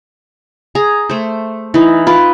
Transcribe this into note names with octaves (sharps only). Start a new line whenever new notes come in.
G#4 A#5
A3 C5
E3 D#4
F4 B4